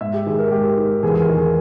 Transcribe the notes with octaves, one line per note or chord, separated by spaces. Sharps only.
G#2 E5
G4
D#3 G#4
A#4
G#2 G4
D#3
E2 G#4
G#4
A#4
D#3
G#4